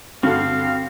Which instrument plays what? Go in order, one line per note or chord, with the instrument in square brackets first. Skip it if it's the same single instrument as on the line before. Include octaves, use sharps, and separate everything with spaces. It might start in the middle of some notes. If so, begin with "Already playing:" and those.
[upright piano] G2 D3 [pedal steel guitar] C4 [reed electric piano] F#4 A4 [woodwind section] F5